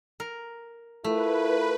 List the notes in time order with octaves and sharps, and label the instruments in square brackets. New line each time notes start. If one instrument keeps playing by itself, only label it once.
[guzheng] A#4
[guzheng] A3 [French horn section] E4 F4 A#4 [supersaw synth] B4